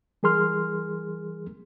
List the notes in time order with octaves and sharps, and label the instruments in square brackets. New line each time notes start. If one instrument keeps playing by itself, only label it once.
[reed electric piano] E3 G3 G#4 A#4 C6 F6